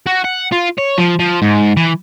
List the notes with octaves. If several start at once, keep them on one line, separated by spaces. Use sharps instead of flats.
F#4
F#5
F4
C#5
F3
F3
G#2
E3